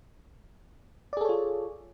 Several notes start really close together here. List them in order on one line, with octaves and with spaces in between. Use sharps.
D5 G#4 A4 C#5 F4